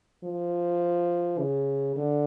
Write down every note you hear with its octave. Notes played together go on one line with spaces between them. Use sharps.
F3
C#3
D3